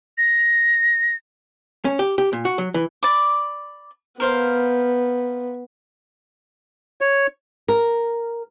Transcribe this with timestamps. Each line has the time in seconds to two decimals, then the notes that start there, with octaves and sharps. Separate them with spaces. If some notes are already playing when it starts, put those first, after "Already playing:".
0.18 A#6
1.85 C#4
1.99 G4
2.18 G4
2.33 A#2
2.45 F#4
2.58 F#3
2.74 E3
3.03 D5 B5 D6
4.20 B3 A#4 C5 F5
7.01 C#5
7.68 A#4